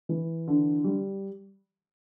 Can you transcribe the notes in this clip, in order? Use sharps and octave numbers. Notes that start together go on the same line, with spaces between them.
E3
D3
G3